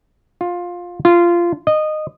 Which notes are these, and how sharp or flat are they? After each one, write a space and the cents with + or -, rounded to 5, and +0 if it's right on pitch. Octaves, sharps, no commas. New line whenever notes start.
F4 +15
F4 -15
D#5 -15